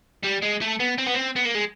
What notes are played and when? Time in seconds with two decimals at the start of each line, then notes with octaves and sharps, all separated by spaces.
0.24 G3
0.43 G#3
0.62 A3
0.80 B3
0.98 C4
1.07 B3
1.14 C4
1.36 B3
1.45 A#3
1.55 G#3